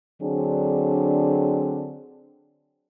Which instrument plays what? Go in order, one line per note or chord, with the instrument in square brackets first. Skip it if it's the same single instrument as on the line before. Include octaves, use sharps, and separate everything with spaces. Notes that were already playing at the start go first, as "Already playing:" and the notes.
[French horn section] D3 F#3 C4 D4 G#4